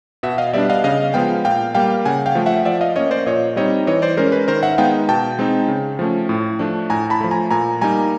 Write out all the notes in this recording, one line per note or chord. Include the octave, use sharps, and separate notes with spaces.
B2 E5 F#5
D#5 F5
G3 B3 D4 D5 E5
D#5 F5
C#3 D#5 F5
F3 G#3 B3 F5 G5
A#2 F5 G5
G3 A#3 F5 G5
C#3 F#5 G#5
F5 G5
F3 A3
E5 F#5
F3 D5 E5
D#5 F5
A#3 C#4 C#5 D#5
C5 D5
A#2 C#5 D#5
G3 C4 D#4 C#5 D#5
E3 C#5 D#5
C5 D5
G#3 C#4 A#4 C5
B4
D#3 A#4 C5
E5 F#5
G#3 B3 D#4 F5 G5
B2 G5 A5
G#3 C4 D#4
C#3
F3 A3 C#4
A2
F3 A3 D4
A2 G#5 A#5
A5 B5
F3 A3
G#5 A#5
A#2 G#5 A#5
G3 A#3 D#4 G#5 A#5